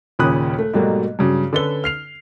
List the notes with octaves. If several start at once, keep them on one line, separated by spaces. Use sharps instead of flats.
D#2 A#2 C#3 B5 D#6 F#6
A3
G#2 B2 F#3 G3 A3 A#3
G2 C#3 F#3
D3 C#4 A4 B4 G7
F6 C7 F7